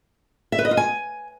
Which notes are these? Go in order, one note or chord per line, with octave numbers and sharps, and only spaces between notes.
E5
B4
D#5
F4
G#5